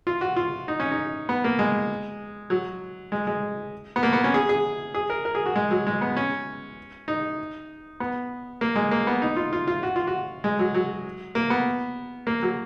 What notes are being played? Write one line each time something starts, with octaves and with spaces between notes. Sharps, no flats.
F4
F#4
F4
D#4
C#4
D#4
B3
A#3
G#3
F#3
G#3
G#3
B3
A#3
B3
C#4
G#4
G#4
G#4
A#4
A#4
G#4
F#4
G#3
F#3
G#3
B3
C#4
D#4
B3
A#3
G#3
A#3
B3
D#4
F4
F4
F4
F#4
F4
F#4
G#3
F#3
F#3
A#3
B3
A#3
F#3